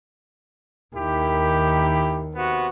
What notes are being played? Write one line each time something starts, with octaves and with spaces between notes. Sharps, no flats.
D#2 D#3 E4 G4
C3 B3 F#4